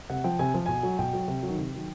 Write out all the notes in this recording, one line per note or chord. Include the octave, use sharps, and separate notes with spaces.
C3 F#5
F3 G5
C3 G#5
F3
B2 G#5
F#3
B2 G5
F#3
C3
D#3 F#3
C3
D#3 F#3